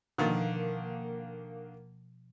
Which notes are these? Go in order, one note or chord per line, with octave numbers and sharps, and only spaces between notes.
B2 D3 D#3 F3 A#3